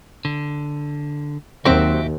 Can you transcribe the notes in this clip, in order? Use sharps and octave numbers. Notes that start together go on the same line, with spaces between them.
D3
D#2 F#3 C4 F#4 G4 E5